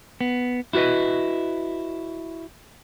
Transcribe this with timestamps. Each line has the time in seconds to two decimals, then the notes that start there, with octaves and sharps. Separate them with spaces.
0.21 B3
0.73 E4 F#4 G4 B4 D#5